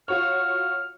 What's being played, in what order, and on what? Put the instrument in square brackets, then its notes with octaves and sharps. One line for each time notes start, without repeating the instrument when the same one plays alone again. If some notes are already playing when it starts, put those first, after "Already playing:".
[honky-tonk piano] F4 F#4 C#5 [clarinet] F6